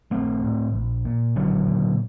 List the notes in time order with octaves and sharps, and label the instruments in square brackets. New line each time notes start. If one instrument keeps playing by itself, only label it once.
[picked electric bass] A#1 A3 C4
A2
A#1
A#2
A#1 D3 F#3
A#2